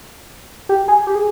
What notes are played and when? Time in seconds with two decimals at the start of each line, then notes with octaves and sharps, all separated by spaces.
0.69 G4
0.88 G#4
1.07 G4
1.15 G#4